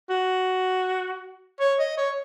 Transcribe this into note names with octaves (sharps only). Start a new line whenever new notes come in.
F#4
C#5
D#5
C#5